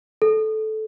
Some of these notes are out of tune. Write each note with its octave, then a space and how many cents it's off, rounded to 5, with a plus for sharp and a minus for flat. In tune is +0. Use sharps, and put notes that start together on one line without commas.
A4 -15